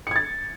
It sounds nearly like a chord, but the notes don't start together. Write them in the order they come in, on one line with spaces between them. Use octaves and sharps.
C#7 G#6 A6